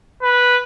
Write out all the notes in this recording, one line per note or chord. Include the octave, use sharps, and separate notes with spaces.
B4